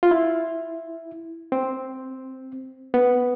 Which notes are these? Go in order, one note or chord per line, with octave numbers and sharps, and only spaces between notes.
F4
E4
C4
B3